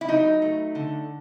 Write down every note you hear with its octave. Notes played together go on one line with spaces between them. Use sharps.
E4
F#3 D#4
A3
D3